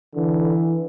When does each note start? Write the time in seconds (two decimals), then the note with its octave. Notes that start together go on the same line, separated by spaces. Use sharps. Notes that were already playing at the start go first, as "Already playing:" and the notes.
0.15 D3 E3